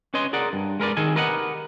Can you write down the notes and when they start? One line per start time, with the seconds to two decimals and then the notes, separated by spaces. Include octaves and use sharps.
0.14 C#4 B4 C#5 D#5 C6
0.33 G#4 A#4 D5 F#5
0.53 G2
0.80 G#3 A#4 B4 D5
0.97 D#3 G#4 A4 G#5
1.15 G4 A#4 B4 D#5 F#5